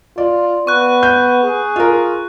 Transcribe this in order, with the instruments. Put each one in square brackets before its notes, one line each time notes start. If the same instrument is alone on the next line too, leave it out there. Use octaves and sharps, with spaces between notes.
[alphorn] F4 [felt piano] D5
[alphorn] B3 [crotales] C#6 F#6
[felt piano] G6
[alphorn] G#4
[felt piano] F4 A#4